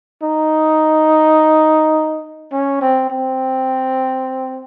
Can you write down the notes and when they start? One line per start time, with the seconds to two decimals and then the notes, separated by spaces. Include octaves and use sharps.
0.23 D#4
2.53 C#4
2.81 C4
3.10 C4